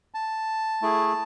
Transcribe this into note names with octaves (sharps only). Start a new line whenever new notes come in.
A5
A3 E4 G#4